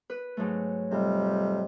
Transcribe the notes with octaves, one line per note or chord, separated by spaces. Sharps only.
B4
G#2 F#3 A3
F2 C3 G3